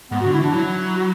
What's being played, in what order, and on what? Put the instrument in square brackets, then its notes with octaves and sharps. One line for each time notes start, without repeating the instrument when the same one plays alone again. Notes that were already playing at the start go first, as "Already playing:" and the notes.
[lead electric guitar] G#2 [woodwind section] B3
[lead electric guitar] D3 [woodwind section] F#4
[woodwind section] E4
[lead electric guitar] E3 [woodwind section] D4
[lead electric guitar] F#3 [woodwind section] E4
[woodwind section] F#4